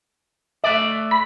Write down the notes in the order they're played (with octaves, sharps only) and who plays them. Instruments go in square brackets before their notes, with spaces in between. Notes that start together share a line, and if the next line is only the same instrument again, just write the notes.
[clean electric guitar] A3 D5 [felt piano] E5 F#6
[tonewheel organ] B5